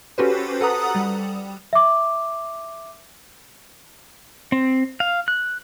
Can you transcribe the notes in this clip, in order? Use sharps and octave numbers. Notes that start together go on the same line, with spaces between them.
C#4 F#4 G4 A4 B4 C5
A4 B4 F#5 A#5 D#6 F#6
G3
E5 D6
C4
F5
F#6